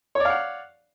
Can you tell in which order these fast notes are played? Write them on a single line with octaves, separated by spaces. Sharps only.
C#5 D5 F5 F#5